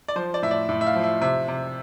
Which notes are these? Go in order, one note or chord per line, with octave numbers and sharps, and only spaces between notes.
D5
F3 C5
D5
A2 E5
D5
A2 E5
E5
F5
F3
E5
C3 E5
C3